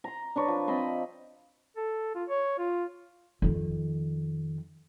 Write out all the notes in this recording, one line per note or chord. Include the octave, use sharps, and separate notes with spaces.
A#5 C6
D4 B4 C#5
F3
C4 D#5 B5 C6
A4
F4
C#5
F4
F2 D#3